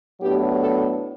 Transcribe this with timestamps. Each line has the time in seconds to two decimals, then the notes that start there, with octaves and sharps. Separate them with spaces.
0.21 A2 F#3 B3 D4 G4
0.60 A4